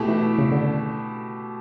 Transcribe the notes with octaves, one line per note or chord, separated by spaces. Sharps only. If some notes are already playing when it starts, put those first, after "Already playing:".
Already playing: B2 A3 E4 G4
E3
C#3
D3